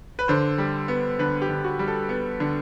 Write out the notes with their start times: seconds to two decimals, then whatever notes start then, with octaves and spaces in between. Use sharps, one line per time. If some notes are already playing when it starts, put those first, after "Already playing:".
0.19 B4
0.28 D3 C5
0.58 G3
0.88 B3
1.19 D3 B4
1.42 G4
1.49 D3
1.64 F#4
1.79 G3
1.88 A4
2.09 B3
2.40 D3